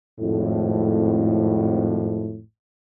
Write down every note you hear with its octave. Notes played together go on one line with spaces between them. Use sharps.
G#1 F2 A2